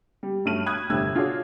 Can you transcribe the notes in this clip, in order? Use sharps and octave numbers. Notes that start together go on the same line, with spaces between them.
G3
G2 F#3 A3 F6 D#7 F#7
B5 D#6 F#6 G#6
G1 A2 C3 D4 E6 G#6
D4 F4 F#4 G#4 C#5